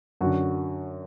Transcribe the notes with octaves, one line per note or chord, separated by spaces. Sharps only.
F#2 D3 F#4